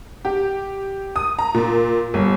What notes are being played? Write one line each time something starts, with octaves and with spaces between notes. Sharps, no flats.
G4
D#6
A#5
A#2
G1